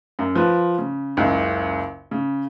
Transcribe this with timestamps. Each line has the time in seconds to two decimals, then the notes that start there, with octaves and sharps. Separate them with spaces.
0.19 F#2
0.35 F3 B4
0.79 C#3
1.17 F#1 C#2
2.11 C#3